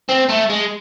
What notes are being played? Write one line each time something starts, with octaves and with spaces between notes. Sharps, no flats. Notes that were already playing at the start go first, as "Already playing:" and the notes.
C4
A3
G#3